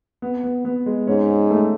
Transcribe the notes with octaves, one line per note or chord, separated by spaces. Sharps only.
B3
B3
B3
G#3
G#2 C#4
C#4
A3